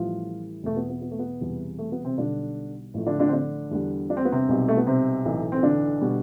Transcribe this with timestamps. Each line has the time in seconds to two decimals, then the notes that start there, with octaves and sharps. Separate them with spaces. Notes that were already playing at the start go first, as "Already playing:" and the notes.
Already playing: A1 A2 E3 F3 G3 F4
0.64 E2 B2 A3
0.76 B3
0.90 B3
1.02 B3
1.11 A3
1.19 B3
1.40 E1 E2 C3 E3 G3
1.79 A3
1.92 B3
2.05 C3 C4
2.17 B1 B2 D3 G3 D4
2.94 A1 A2 F3 A3
3.07 D3 D4
3.19 D3 D4
3.28 C4
3.32 D3 D4
3.71 E2 D3 G3
4.10 D4
4.17 C4
4.25 B3
4.32 C3 C4
4.49 B1 B2 G3
4.68 A3
4.77 B3
4.87 C3 C4
5.25 B1 A2 E3 A3
5.52 C4
5.63 D3 D4
6.01 B2 G3